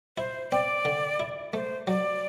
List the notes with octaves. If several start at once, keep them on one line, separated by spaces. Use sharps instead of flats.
E4 C5
C4 D5
D3
E4
A3 C5
F#3 D5